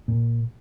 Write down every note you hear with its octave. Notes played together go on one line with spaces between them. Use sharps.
A#2